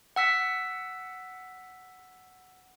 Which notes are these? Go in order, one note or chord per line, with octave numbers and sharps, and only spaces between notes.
F#5 E6 B6